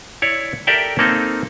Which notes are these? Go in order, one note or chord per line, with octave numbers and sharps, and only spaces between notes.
E4 C#5 D5
G4 A4 A#4 D5 E5 G5
A#3 C4 D#4 A4